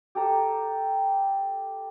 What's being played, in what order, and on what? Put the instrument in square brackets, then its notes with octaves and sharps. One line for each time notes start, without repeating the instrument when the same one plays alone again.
[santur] G4 A4 A#5